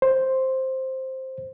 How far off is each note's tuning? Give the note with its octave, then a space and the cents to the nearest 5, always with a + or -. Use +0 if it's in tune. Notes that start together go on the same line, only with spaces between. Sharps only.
C5 +5